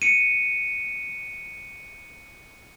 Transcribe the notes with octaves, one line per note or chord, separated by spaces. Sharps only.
C#7 D#7